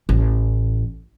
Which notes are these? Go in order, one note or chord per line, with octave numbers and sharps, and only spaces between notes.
A1